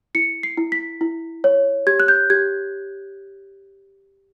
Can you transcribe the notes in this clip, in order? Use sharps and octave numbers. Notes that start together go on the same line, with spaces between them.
E4 C#7
C7
E4
B6
E4
C#5
G4 G#6
F#6
G6
G4 G#6